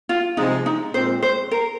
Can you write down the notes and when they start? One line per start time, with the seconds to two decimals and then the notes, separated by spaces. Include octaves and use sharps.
0.09 F4
0.37 C3 F3 G#3 D#4
0.66 D#4
0.94 A#2 G#3 C4 C5
1.23 C5
1.51 A#4